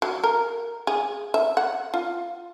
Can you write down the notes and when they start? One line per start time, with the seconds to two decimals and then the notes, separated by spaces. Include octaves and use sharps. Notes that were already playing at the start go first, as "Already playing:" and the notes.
0.02 F#3
0.24 A#4
0.87 G#4
1.34 E5
1.57 F#5
1.94 F4